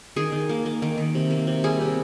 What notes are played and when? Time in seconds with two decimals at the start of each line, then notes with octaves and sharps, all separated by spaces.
0.16 D#3 G#4
0.32 D#3
0.49 A#3
0.66 A#3
0.82 D#3
0.98 D#3
1.15 C3
1.31 A#3
1.47 C3
1.64 G3 G#4
1.81 C3